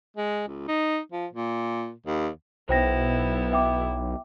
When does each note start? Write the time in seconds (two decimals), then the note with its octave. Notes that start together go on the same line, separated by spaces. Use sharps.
0.17 G#3
0.48 C#2
0.68 D#4
1.12 F3
1.33 A#2
2.06 D#2
2.69 B1 B3 E4 C5 G5 A#6
3.52 E5 G5 D6